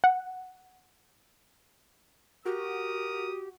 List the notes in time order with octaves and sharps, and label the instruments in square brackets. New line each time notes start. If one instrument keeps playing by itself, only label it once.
[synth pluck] F#5
[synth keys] F#4 [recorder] G4 [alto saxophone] A#4 [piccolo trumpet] D#6